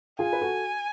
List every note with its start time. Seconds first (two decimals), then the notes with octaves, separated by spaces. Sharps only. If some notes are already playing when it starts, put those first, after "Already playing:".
0.19 F4 G#4 G#5
0.33 B4
0.41 F#4 A4